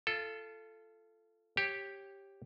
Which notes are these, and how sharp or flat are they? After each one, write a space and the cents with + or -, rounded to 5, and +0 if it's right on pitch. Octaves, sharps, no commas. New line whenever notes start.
F4 -25 A4 +0
G4 +0 C#5 -20